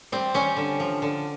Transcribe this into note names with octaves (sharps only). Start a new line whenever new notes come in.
G3 C4
G3 C#4
D3
F3
D3